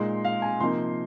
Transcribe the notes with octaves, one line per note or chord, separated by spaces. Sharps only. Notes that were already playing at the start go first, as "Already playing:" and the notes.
Already playing: A#2 G#3 D#4 C6
F5
G#5
C3 F3 A#3 D#4 C6